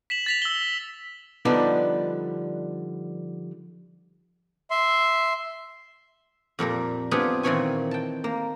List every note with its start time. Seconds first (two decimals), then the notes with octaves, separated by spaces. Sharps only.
0.10 B6 E7 F#7
0.26 A6 B6 F7
0.42 E6 G7
1.45 D3 F3 G3 B3 D4 D#4
4.71 E5 C6
6.59 F2 A#2 G3 A#4
7.11 B3 C4 D4 F4 G4 G#4
7.43 A#2 D#3 E3 C4 C#5 G#5
7.91 G5 A5
8.24 A#3